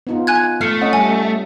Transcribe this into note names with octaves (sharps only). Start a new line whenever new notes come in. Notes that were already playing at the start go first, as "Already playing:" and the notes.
B3 D#4 F4
G#5 F#6 G#6
A3 F6 C7 C#7
C#4 D#5 F#5
G3 G#5